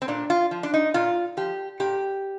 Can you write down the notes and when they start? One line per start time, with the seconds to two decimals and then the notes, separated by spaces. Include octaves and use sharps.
0.02 C4
0.08 A#2 D4
0.30 F4
0.51 F3
0.63 D4
0.74 D#4
0.94 A#2 F4
1.37 F3 G4
1.80 A#2 G4